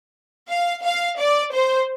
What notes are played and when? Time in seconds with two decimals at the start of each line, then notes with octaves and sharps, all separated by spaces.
0.51 F5
0.84 F5
1.19 D5
1.53 C5